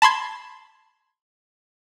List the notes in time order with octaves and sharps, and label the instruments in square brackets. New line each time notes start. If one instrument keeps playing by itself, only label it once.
[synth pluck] A5 B5 C6 G#6